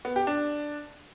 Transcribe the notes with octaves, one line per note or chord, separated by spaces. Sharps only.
B3
G4
D4